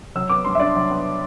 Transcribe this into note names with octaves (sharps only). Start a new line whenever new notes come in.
F#3 E6
B3 D6
G2 C6
E5
D4 D5
F#3
B3